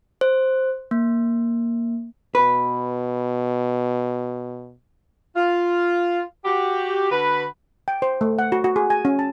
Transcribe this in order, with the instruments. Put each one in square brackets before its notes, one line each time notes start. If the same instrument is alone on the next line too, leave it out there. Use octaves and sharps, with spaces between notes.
[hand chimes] C5
A#3
[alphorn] B2 [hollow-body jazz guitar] B4
[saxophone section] F4
F#4 G4
D3 F#4 B4
[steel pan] G5
C5
A3
F#5
F#4
F#4
G#4
G#5
C#4
A5